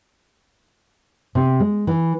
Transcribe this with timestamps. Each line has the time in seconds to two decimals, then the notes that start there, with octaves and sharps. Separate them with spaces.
1.35 C3
1.60 G#3
1.87 E3